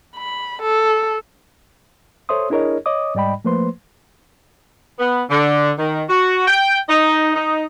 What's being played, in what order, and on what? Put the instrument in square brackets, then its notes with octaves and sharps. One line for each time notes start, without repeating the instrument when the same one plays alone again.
[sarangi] B5
A4
[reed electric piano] A4 C5 C#5 E5 C6 D#6
D4 E4 G#4 A#4 C#5 D#5
C#5 D#5 D6 D#6
G#2 G3 D5 D#5 G5 B5
F3 A3 A#3 B4 C5 C6
[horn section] B3
D3
D#3
F#4
G5
D#4
D#4